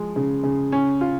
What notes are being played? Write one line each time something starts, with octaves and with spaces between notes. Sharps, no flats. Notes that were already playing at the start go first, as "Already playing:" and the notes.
Already playing: F3 G#3
C#3
C#3
C#4
F4